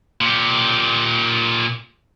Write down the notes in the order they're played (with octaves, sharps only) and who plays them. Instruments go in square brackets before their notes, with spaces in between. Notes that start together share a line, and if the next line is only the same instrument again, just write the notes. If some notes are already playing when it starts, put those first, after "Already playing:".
[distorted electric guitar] A#2 G4